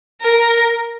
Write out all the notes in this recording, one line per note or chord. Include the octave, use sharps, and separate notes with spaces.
A#4